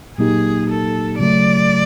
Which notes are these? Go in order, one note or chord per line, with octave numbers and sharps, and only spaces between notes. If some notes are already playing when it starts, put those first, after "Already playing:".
A#2 F#3 A#3 D#4 G4 G#4
A4
C#3 F#3 A3 D5